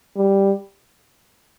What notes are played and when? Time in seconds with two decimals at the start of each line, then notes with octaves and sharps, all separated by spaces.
0.16 G3